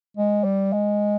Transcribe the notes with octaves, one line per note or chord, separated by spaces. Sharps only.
G#3
G3
G#3